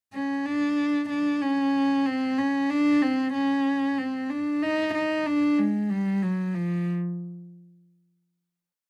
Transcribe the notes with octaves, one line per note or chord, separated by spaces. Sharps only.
C#4
D4
D4
C#4
C4
C#4
D4
C4
C#4
C4
D4
D#4
D#4
D4
G#3
G3
F#3
F3